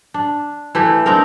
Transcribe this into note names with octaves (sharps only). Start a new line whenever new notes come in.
D4
E3 A3 G4
C4 D4 D#4 A#4